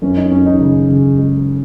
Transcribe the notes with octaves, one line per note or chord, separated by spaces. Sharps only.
F#2 C#4
D#4
F#2 C#4
D#4
C#3
C#3
G#3